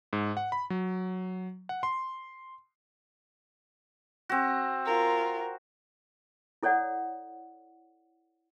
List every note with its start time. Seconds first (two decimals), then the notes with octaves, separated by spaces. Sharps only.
0.13 G#2
0.37 F#5
0.52 B5
0.70 F#3
1.69 F#5
1.83 C6
4.29 C4 F#4
4.86 F4 A#4
6.63 E4 A4 C#5 D5 F#5